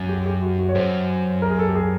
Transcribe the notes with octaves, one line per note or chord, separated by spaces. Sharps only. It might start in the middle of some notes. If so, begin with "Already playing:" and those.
Already playing: F#2
G4
G4
F#4
F#4
C#5
F#2 C5
A#4
G#4
A4
G4
G#4